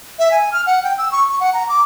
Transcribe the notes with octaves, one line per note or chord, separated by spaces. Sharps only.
E5
G#5
F6
F#5
G5
E6
C#6
C#6
F#5
A#5
D6